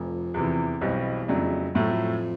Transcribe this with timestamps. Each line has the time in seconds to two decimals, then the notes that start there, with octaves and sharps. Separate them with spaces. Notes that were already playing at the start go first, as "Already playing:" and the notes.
Already playing: F1 F2
0.34 E2 C3 E3
0.81 B1 E2 B2 G3 C4
1.28 F2 C#3 F#3 A3 D4
1.75 F2 A2 F#3 A3